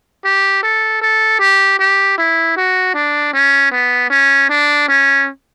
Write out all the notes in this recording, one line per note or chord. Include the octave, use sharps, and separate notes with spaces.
G4
A4
A4
G4
G4
E4
F#4
D4
C#4
B3
C#4
D4
C#4